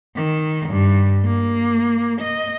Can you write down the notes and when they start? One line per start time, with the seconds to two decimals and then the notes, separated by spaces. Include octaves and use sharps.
0.16 D#3
0.69 G2
1.25 A#3
2.22 D#5